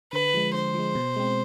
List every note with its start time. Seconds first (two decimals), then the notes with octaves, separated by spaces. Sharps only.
0.12 D3 B4
0.34 F3 G#3
0.54 D3 C5
0.74 F3 G#3
0.95 B2
1.16 G#3 C4